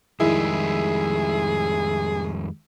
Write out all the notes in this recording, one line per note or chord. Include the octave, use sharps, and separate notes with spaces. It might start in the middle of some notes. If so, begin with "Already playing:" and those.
F2 D#3 G3 G#3 E4 G#4